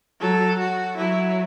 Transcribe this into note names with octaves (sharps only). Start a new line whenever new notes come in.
F#3 A4
F#4
F#3 E4